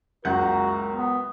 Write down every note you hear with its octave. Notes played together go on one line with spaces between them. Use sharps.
F#1 C#2 F#4 A#4 F#5 A#5 G6
B3